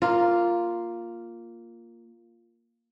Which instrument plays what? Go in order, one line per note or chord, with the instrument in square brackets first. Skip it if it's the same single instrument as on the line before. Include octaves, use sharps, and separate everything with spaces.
[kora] A#3 F4